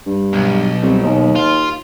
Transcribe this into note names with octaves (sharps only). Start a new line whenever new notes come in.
G2
B1
C2
D#2
F4